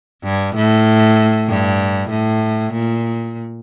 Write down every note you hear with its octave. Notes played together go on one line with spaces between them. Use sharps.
G2
A2
G2
A2
A#2